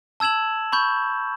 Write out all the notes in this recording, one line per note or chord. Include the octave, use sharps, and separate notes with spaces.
A5 E6 G#6 E7 F#7
B5 C#6 G6